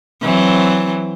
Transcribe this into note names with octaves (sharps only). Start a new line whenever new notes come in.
E3 F#3 C4